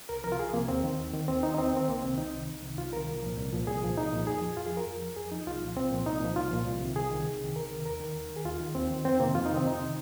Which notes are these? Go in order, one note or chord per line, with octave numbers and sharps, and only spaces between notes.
C2 A#4
C3 F3 A#4
F4
C2 G#4
C3 F3 A#3
D#2 C4
D#3
D#2
D#3
D#2 C4
D#3 D#4
D#4
D#2 C4
D#3 C4
C2 A#3
C3 D#3 C4
C2 D#4
C3 D#3
C2
C3 D#3
C2 F4
C3 D#3 A#4
C2
A#2 F3
C2
A#2 F3
C2 G#4
A#2 F3
C2 D#4
A#2 F3
F2 G#4
F3
F2 F4
G#4
F3 A#4
F2
F3
F2 G#4
F3 D#4
C2 F4
A#2 F3
C2 C4
A#2 F3
C2 D#4
A#2 F3
C2 F4
A#2 F3
C2
C3 D#3
C2 G#4
C3 D#3
C2
C3 D#3
C2 A#4
C3 D#3
D#2 A#4
D#3
D#2
D#3
G#4
D#2 F4
D#3
D#2 C4
D#3
F2 C4
C3 D#3 A#3
F2 F4
C3 D#3 D#4
C4
F2 D#4
C3 D#3